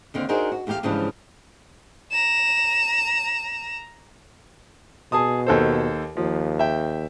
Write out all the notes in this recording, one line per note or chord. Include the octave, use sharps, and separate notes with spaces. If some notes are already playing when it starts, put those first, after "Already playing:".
D#2 D3 C4 F5
D4 D#4 F#4 G#4 A#4 C5
F#4
E2 A3 G4 A4 F5
G#2 C#3 E3 F3 G3 D4
A#5 E7
B2 G#4 A5 D#6
D#2 A4 C5
D#2 F3
E5 G5